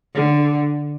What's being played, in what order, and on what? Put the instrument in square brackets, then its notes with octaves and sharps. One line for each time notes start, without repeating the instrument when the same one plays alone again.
[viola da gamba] D3